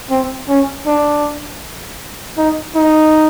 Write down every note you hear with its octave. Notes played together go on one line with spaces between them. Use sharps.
C4
C#4
D4
D#4
D#4